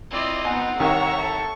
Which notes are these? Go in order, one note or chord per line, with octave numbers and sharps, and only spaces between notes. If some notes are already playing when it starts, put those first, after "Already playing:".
C4 E4 F4 D5 D#5
B3 D#4 F#5 G#5
C2 D#3 C#5 E5 A#5 C#6
A4